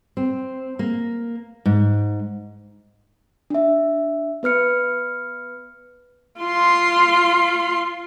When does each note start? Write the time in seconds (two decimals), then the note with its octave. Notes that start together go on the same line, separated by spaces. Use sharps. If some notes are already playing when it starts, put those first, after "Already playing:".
0.17 C4
0.79 A#3
1.66 G#2
3.50 D4 E5
4.43 B3 B4 F6 C#7
6.41 F4 C6